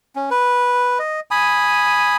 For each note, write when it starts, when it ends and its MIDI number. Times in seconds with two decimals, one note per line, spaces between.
0.16 0.29 61
0.31 0.99 71
0.99 1.20 75
1.31 2.17 80
1.31 2.17 83
1.31 2.17 87